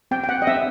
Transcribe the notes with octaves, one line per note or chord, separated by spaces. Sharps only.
C4 G5
G5
F#5
D#5
C4 E5